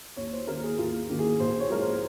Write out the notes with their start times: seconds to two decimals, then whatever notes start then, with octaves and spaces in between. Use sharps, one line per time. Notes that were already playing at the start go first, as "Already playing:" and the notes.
0.17 D#2 C#5
0.33 C5
0.47 D#3 A#3 A#4
0.63 G#4
0.78 D#2 F4
1.09 D#3 A#3
1.19 G#4
1.39 A#1 C5
1.60 C#5
1.70 A#2 F3 G#3 A#4
1.81 C5